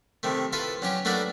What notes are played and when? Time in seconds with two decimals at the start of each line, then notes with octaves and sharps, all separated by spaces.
0.23 C3 D#3 A3
0.53 E4 F4 A4 B4
0.82 F#3 C#4 G4
1.05 A3 A#3 D4 F#4 B4 D5